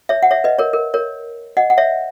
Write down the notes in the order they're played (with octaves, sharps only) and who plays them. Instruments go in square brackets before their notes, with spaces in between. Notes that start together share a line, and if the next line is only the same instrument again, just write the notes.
[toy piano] C#5 E5
F#5
C#5 E5
B4 D#5
A#4 C#5
A#4
A#4 C#5
D#5 F#5
F#5
C#5 E5